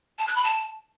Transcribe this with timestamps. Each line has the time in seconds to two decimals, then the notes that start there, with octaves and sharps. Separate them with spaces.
0.18 A5
0.27 F#6
0.35 B5
0.44 A5